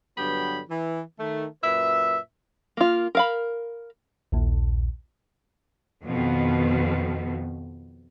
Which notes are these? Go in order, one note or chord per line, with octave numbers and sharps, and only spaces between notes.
G2 D3 F#3 B3 G4 B5
E3
D#3 A3
F#2 A#2 B4 E5
A#3 F4
A#4 F5 B5
A#1 D#2 A#2
F2 B2 D#3